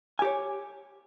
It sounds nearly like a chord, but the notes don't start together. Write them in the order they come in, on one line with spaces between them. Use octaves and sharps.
G#5 G4 C#5